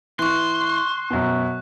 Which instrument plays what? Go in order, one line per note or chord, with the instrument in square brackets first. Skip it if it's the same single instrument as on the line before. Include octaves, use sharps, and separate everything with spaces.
[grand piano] E3 [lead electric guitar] C6 [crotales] C#6 F#6
[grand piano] F#2 B2